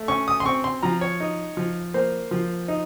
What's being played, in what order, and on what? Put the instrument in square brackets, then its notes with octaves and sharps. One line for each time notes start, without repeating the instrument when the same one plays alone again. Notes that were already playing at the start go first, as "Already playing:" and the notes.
Already playing: [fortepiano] A3
C#4 C#6
D#6
C6
C4 C#6
C6
F3 A#5
C#5
D#4
F3
A#3 C5
F3
D#4